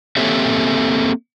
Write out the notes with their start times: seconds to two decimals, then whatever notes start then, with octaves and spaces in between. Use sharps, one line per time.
0.17 A#3 C4 G4 A4 C#5 E5